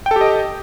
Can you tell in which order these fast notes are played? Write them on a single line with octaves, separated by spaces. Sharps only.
G5 A4 G4 D#5